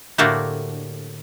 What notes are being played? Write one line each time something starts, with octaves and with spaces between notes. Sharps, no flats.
A2 D3 A3 A#3 F#4 G4